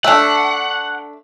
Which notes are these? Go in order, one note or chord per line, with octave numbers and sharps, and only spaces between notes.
A3 D4 F#5